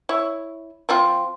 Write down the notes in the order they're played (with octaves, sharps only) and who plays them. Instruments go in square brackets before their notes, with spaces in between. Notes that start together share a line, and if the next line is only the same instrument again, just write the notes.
[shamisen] E4 C#5
F3 C4 F4